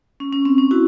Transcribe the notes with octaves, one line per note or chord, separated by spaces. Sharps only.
C#4
C#4
C4
C#4
E4 F#4